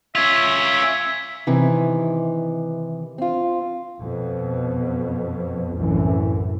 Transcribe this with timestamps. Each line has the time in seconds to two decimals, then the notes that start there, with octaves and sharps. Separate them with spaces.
0.15 C#4 F4 E5 G#6 B6
1.47 C3 D#3 E3
3.18 C4 F4
4.01 F2 B2
5.78 C2 F#2 A2 E3